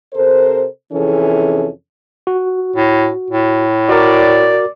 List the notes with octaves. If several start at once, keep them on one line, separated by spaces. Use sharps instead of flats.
C3 A4 A#4 C5
F2 C3 E3 C#4 G#4 A4
F#4
A2
A2
F#4 A#4 D5